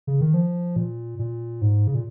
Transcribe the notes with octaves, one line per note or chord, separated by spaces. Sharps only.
C#3
D#3
F3
A#2
A#2
G#2
C#3
A#2